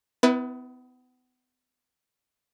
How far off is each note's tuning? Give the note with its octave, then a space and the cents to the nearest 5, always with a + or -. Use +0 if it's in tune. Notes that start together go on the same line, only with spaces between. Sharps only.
B3 +35 E4 -15 B4 -15